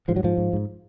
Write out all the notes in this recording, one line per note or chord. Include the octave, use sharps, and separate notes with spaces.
G#2 F3
F#3
G#2 F3
G#2
G#2